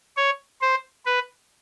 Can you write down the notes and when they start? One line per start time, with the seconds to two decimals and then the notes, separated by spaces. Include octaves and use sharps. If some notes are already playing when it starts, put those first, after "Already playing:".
0.17 C#5
0.61 C5
1.06 B4